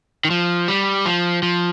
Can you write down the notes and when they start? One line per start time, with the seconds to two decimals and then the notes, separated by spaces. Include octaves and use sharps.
0.25 D#3
0.30 F3
0.68 G3
1.06 F3
1.43 F3